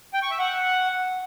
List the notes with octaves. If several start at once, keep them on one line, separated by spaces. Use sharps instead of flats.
G5
C#6
E5
F#5